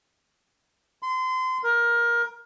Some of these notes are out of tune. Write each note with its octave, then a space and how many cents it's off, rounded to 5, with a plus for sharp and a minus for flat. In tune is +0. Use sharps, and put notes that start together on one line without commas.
C6 -30
A#4 +20